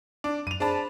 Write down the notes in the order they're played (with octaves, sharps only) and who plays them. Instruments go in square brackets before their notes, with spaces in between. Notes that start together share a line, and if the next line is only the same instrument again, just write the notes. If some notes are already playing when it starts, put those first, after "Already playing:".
[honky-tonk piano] D4 [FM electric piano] D6
[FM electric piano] F#2 [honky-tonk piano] D#7 F7
[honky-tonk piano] D4 A5 [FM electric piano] G#4 C5 B5